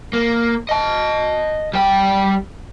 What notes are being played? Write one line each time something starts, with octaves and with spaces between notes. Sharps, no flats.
A#3
D#5 A5
G3 G5